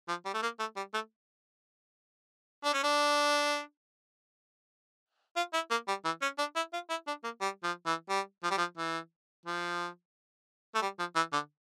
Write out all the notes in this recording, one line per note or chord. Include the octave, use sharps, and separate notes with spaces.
F3
G3
A3
A#3
A3
G3
A3
D4
C#4
D4
F4
E4
A#3
G3
E3
C#4
D4
E4
F4
E4
D4
A#3
G3
F3
E3
G3
F3
G3
F3
E3
F3
A3
G3
F3
E3
D3